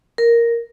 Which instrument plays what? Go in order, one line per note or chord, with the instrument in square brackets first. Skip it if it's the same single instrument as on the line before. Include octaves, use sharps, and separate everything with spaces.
[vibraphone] A#4